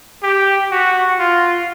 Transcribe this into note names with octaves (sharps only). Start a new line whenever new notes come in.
G4
F#4
F4